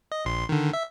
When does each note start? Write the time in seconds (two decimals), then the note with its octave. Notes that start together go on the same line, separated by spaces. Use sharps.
0.12 D#5
0.25 A#1 C6
0.49 D3 D#3
0.73 E5